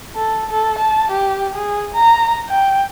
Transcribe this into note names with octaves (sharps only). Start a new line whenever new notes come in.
A4
A4
A5
G4
G#4
A#5
G5